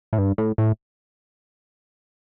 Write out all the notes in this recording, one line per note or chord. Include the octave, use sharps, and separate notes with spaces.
A2
G2
A2
A2